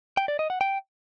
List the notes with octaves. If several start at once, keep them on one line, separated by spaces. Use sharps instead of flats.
G5
D5
D#5
F#5
G5